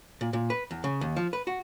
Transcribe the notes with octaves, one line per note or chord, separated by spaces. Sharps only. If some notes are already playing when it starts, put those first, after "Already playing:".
A#2
A#2
B4
E2
C#3
D#2
F3
B4
F#4